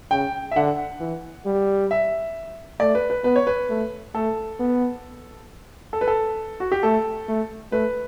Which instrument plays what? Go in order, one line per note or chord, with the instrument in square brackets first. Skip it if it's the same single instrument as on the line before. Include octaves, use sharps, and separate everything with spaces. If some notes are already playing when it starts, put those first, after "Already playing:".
[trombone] C#3 [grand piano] G5
[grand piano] E5
[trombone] D3 [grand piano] F#5
[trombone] E3
G3
[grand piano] E5
[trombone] A3 [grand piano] D5
[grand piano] B4
B4
[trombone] B3 [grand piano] B4
[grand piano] C#5
B4
[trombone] A3
[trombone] A3 [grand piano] A4
[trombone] B3
[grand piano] A4
B4
A4
F#4
G4
[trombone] A3 [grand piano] A4
[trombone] A3
[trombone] A3 [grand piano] B4